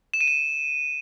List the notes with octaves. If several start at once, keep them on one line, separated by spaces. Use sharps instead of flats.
E7
D#7
E7